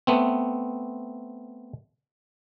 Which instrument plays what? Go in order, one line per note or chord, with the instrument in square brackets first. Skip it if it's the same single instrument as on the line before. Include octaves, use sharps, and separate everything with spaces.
[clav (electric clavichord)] A3 B3 C4